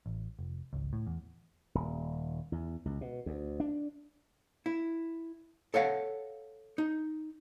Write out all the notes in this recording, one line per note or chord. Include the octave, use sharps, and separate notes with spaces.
A1
F1
G#1 C#2
A2
E2
D#1
E2
C#2
B2
D2
D4
E4
A4 C#5 F5 F#5
D#4